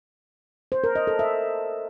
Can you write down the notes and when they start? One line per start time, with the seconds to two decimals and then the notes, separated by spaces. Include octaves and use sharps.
0.72 C5
0.84 A#4
0.95 D#5
1.07 A4
1.19 E5